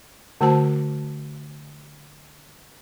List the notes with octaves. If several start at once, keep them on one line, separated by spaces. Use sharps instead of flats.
D3 A3 F#4 C5 A5